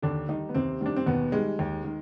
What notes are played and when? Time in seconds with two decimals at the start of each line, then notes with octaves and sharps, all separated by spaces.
0.02 D#2 D3 D4
0.29 D#3 G3 D#4
0.49 B3
0.54 D#2 C3 C4
0.81 D#3 G3 D4
0.96 C4
1.06 D#2 B2 B3
1.32 D#3 G3 G#3
1.59 D#2
1.84 D#3